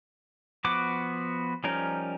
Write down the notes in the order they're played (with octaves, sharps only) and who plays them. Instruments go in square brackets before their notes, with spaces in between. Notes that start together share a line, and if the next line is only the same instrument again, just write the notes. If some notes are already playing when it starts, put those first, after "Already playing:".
[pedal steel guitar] F3 B3 F#4 D6
F3 G3 C#4 D#4 A#4